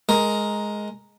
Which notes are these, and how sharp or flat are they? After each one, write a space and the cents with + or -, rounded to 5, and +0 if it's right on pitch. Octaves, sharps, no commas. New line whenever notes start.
G#3 +10 A#4 +0